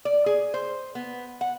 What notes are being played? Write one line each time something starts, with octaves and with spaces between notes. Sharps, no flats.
D5
G#4
C5
B3
F#5